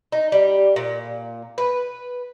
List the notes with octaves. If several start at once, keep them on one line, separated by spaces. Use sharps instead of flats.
D#4
G3
A#2
B4